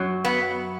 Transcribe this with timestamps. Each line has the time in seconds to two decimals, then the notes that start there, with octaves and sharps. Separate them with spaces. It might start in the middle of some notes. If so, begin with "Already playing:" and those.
Already playing: F#2 F#3
0.25 B3